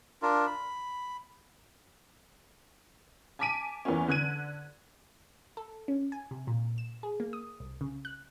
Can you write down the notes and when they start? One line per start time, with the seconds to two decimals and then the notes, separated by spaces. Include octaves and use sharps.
0.22 D4 F4 A#4
0.47 B5
3.39 G#5 A5 D6 B6 D7 D#7
3.85 E2 A#3 B3 C#4
4.08 D3 F#6 G#6 D#7
5.57 A4
5.88 C#4
6.12 G#5
6.31 C3
6.47 A#2
6.78 E7
7.03 G#4
7.20 A#3
7.33 D#6
7.60 C2
7.81 C#3
8.05 F#6